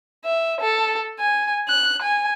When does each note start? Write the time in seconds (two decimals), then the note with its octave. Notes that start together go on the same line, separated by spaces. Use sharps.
0.25 E5
0.61 A4
1.19 G#5
1.68 F#6
2.02 G#5